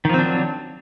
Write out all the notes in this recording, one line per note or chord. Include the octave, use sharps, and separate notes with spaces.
D#3 F3 F#3 C4 D4